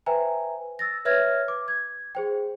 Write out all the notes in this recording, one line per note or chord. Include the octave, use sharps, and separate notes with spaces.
B4 C5 E5 G5 G#5 A#5
E6 A6 A#6
B4 C#5 E5 F6 G#6 A#6
D6
G#6
G#4 C5 G5